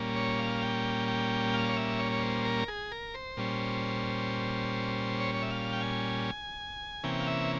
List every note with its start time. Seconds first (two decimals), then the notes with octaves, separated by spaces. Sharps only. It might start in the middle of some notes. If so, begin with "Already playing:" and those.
Already playing: A#2 G3 A#3 C#4
0.16 C#5
0.39 F5
0.63 G5
1.08 G5
1.54 F5
1.69 C#5
1.77 E5
1.99 C#5
2.12 C#5
2.22 C5
2.45 A#4
2.68 G#4
2.92 A#4
3.14 C5
3.37 A#2 G3 C#4
5.20 C#5
5.34 C#5
5.42 E5
5.51 F5
5.73 G5
5.81 G#5
7.03 C3 E3 A#3 C#4 G5
7.20 F5
7.27 E5